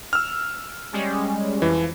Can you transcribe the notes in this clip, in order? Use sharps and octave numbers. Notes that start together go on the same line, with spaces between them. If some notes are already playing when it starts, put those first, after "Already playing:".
E6 F6
G3 G#3 C#4
F2 E3